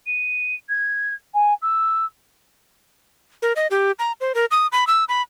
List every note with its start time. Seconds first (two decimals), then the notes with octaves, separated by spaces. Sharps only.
0.07 D#7
0.69 G#6
1.34 G#5
1.62 E6
3.42 A#4
3.56 D#5
3.71 G4
3.99 A#5
4.21 C5
4.35 A#4
4.51 D#6
4.72 B5
4.87 E6
5.09 B5